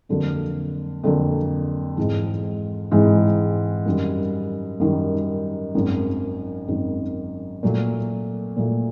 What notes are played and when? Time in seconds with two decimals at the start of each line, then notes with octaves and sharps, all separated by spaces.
0.09 F2 D3 F#3 A#3
1.03 F2 D3 F#3 A#3
1.97 G#2 E3 G#3 C4
2.91 G#2 E3 G#3 C4
3.86 F#2 D#3 G3
4.80 F#2 D#3 G3
5.75 G#1 F#2 D#3
6.68 G#1 F#2 D#3
7.63 A#2 F#3 A3
8.57 A#2 F#3 A3